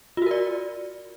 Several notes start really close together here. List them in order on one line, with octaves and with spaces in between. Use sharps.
F4 F#4 A#4 D5